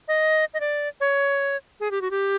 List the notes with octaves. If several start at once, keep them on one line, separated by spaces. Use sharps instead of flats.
D#5
D#5
D5
C#5
G#4
G4
F#4
G4